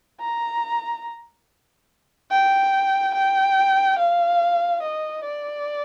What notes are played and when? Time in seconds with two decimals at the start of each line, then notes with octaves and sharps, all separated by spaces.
0.20 A#5
2.31 G5
3.15 G5
3.99 F5
4.82 D#5
5.24 D5